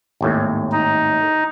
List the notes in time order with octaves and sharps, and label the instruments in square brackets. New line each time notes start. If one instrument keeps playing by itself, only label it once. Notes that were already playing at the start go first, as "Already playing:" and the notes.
[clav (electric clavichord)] G#1 D#2 A2
[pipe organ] D#4